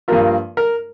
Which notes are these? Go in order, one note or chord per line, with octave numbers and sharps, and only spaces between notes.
G2 F3 A#3 F4 A#4
A#4